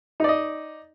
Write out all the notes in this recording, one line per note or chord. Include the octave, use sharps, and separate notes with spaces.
D#4 D5 D#5